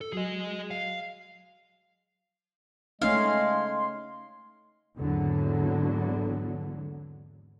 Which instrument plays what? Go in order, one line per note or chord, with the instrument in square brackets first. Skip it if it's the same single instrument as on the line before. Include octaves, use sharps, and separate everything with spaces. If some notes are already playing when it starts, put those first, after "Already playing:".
[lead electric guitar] A4
[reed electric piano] F#3 F#4 [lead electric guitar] G#4 D#5
[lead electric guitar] F5
[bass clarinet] G#3 [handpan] A3 C#4 D#4 [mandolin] F5 [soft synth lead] C6
[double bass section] G#1 E2 D3 F#3